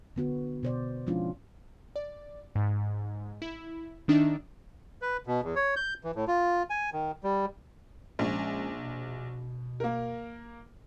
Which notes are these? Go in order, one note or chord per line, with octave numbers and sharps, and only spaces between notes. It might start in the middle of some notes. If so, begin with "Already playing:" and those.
D3 B3 F#4
B2 C5 D5
F3 G#3 C#4 D4 E4 F4
D5
G#2
E4
D#3 D4 D#4 E5
B4
B2
E2
C#5
G6
E3
A2
F4
G#5
D#3
G3
A#1 G#3 C#4
B2
A#3 A#4